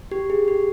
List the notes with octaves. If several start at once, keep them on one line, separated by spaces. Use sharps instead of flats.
G4
G#4
G4